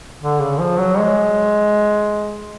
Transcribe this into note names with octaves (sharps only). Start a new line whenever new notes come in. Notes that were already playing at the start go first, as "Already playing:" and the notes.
D3
C#3
F3
F#3
G#3